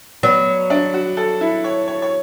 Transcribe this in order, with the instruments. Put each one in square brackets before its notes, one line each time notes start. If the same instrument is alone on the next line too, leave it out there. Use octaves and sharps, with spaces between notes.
[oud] F#3 [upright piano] B3
[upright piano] D4
F#4
A4
E4
C#5
C#5
C#5